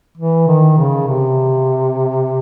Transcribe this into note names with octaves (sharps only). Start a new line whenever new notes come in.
E3
D#3
C#3
C3